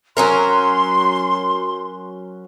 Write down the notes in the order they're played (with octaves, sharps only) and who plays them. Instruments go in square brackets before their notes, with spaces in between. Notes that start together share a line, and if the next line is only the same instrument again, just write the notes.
[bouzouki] F#3 C#4 A#4 [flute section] C6